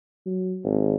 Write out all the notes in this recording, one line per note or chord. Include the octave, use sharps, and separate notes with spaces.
F#3
G#1